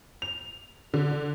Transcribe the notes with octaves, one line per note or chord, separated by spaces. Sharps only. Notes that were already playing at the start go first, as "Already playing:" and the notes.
F7
D3